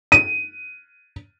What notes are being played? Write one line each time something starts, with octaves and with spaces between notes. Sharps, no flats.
D#7